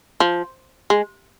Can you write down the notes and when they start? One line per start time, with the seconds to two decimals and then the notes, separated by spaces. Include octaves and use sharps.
0.20 F3
0.90 G#3